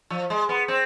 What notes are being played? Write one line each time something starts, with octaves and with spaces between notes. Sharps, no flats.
F3
G#3
B3
C4